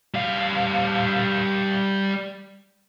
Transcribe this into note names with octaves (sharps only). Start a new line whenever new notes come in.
G3 F5